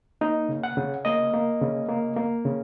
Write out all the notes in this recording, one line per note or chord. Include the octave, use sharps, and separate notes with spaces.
A#3 D#4
C#3
F#5
C#3
A#3 D#5
A#3
C#3
A#3
A#3
C#3